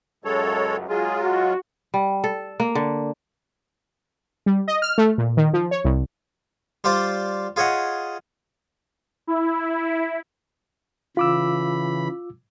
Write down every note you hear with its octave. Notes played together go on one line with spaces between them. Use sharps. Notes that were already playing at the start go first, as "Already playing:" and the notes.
C#2 F#2 G#3 A4 C#5
F#3 G#3 F4 G#4
F#4
G3
A4
A#3
D3
G3
D#5
F6
A3
A#2
D#3
F3
C#5
C2
G3 F4 C5 D5
F4 G#4 C#5 D#5 F#5
E4
C#3 E3 F4 B5 D6 E6